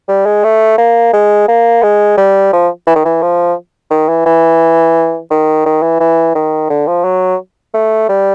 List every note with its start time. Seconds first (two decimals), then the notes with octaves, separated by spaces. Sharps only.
0.08 G3
0.26 G#3
0.44 A3
0.78 A#3
1.13 G#3
1.48 A#3
1.83 G#3
2.17 G3
2.53 F3
2.87 E3
2.96 D#3
3.05 E3
3.22 F3
3.91 D#3
4.09 E3
4.26 E3
5.31 D#3
5.66 D#3
5.83 E3
6.00 E3
6.35 D#3
6.70 D3
6.87 F3
7.04 F#3
7.74 A3
8.09 G3